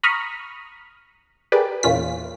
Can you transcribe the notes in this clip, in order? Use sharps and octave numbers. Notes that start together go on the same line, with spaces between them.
A#5 B5 C#6 D#6 F6
G4 G#4 A#4 B4 D5
E2 A#2 C#4 F4 B6